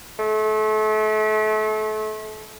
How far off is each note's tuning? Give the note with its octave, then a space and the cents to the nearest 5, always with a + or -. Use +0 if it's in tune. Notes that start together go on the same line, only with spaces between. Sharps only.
A3 -35